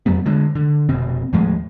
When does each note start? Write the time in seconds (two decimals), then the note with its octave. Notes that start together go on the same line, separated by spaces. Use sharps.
0.06 F2 F#3 G3 B3
0.26 D3 G#3
0.55 D3
0.89 F1 B2 C4
1.33 D#2 A2 F3 G#3